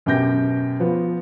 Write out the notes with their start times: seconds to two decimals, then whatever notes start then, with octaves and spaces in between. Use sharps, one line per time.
0.06 F#2 B2 G4 G5 G6 A#6
0.80 F3 B3